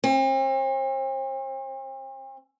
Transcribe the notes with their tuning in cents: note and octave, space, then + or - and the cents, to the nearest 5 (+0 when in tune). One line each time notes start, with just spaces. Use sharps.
C4 +40